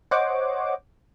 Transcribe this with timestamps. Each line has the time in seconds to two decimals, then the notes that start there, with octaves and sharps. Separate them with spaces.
0.11 C5 C#5 D#5 F#5 D6